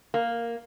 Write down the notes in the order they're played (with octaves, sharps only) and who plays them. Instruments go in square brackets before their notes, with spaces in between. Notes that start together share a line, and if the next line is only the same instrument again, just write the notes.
[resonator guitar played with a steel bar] A#3